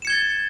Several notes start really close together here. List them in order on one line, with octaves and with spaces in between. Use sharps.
E7 C#7 G#6 G7 A6